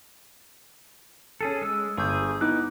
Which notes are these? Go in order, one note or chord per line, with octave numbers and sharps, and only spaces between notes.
C#4 G#4 A4
G#3 E6
G1 G#4 E6 G6
B3 D#4 E4 D6 F#6